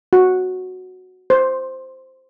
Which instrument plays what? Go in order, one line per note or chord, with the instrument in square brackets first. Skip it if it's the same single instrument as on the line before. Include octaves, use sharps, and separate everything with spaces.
[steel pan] F#4
C5